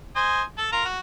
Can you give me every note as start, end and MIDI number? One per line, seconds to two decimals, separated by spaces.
0.16 0.42 72
0.16 0.42 75
0.16 0.42 80
0.58 0.70 69
0.58 0.70 81
0.72 0.85 65
0.72 0.85 70
0.72 0.85 82
0.85 0.99 66